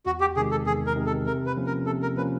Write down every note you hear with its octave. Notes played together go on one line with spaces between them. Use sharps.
E2 F#4
G4
C3 D#3 G#3 G#4
A4
E2 G#4
A#4
C3 D#3 G#3
A4
C3 A#4
B4
F3 A#3 C#4
A#4
C3 A4
A#4
F3 A#3 C#4 B4